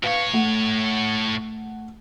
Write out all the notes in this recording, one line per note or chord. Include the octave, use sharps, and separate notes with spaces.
A2 B4 C#5 F5
A3 F#5